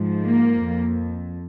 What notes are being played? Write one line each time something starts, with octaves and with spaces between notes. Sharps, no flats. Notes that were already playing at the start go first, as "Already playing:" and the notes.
Already playing: G#2 F3
A#3
F2